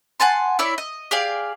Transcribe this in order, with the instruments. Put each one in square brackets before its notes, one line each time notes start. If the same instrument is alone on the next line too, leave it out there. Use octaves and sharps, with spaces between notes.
[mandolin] F#5 G#5 A5 C6
E4 C#5 D5 E5
D#5
G4 G#4 D5 F5